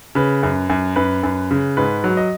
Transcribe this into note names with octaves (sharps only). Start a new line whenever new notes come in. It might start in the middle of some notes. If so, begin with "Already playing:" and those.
C#3 B4
F#2
F#2
F#2 B4
F#2
C#3
G#2 B4
F#3
D#5